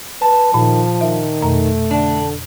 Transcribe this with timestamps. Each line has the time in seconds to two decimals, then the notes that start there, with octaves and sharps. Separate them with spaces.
0.22 B4 A5
0.54 A#2 D#3 F3
1.01 D#3 E5
1.42 F2 B2 A3 A#5
1.91 D3 D4